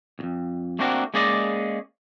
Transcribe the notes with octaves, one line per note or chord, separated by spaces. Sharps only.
C2 F2
A3 A#3 C4 D4 F#4 A#4
G#3 A#3 C#4 G#4 D5 D#5